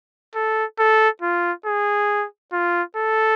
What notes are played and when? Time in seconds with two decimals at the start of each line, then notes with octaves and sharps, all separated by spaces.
0.35 A4
0.79 A4
1.22 F4
1.66 G#4
2.52 F4
2.97 A4